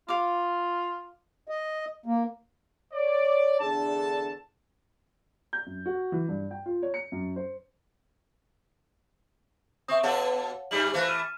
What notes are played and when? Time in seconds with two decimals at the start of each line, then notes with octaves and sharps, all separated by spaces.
0.08 F4 F5 D6
1.48 D#5
2.06 A#3
2.93 C#5 D5
3.60 E2 D3 D4 G#4 A4 A5
5.53 G6
5.66 F#2
5.86 F#4
6.12 E3
6.28 G2
6.51 G5
6.66 F4
6.82 C#5
6.94 C#7
7.12 F#2
7.36 C5
9.88 C4 E5 C#6 D#6
10.03 B2 A4 C#5 F5 F#5
10.71 G2 G3 F#7
10.93 E3 A3 C5 F5 F#6
11.08 F6 D#7 E7